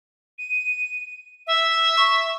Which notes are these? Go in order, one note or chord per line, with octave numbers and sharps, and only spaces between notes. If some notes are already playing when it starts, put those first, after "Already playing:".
D#7
E5
C#6